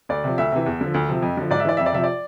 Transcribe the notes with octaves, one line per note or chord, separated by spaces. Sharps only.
D2 D5
C3 F3
D2 E5
C3 E3
E2
D3 F3
D2
C3 F3
F2
D3 F3
G#2 D5
E5
E3 D5
F2 E5
D5
C3 F3 E5
D5